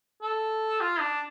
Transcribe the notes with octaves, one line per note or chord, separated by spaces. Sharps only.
A4
F4
D4